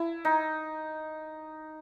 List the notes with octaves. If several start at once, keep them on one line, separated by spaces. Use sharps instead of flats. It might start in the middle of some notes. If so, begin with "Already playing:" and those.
Already playing: E4
D#4